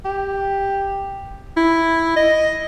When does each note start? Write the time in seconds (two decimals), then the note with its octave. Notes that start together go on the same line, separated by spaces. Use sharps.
0.05 G4
1.57 E4
2.16 D#5